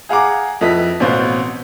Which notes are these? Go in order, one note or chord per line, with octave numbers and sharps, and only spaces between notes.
G#4 F5 F#5 A#5 D6
F2 E4 B4 D#5 B6
A1 B2 C4 B4 F5